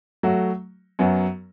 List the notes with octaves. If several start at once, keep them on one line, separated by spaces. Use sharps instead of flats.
F#3 A3 F#4
F#2 F#3 B3